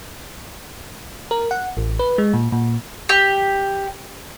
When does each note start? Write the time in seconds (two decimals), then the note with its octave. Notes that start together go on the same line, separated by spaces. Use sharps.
1.31 A#4
1.51 F#5
1.77 A1
1.99 B4
2.18 G#3
2.34 A#2
2.52 A#2
3.09 G4